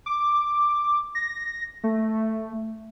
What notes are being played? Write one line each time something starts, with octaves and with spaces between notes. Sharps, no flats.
D6
A#6
A3